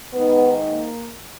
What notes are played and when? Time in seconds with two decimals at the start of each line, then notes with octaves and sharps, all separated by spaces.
0.13 G#2 D#3 B3
0.66 A#3